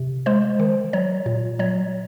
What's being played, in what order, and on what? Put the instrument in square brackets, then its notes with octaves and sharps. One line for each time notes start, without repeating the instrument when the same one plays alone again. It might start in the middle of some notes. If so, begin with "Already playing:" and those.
Already playing: [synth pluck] C3
G#3 C5
D#3
F#3 C#5
A#2
F#3 C#5